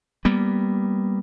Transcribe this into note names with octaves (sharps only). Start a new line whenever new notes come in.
G3 A#3 B3